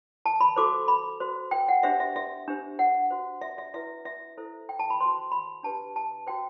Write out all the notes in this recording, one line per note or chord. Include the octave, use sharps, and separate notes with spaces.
A5
B5
F#4 A4 C5 D6
B5
F#4 C5
G5
F#5
D4 G4 C5 E5
E5
E5
D4 G4 C5
F#5
F#4 C5
E5
E5
E4 B4 E5
E5
E4 A4 C5
G5
A5
B5
F#4 C5 C6
B5
D4 G4 B4 A5
A5
F#4 C5 G5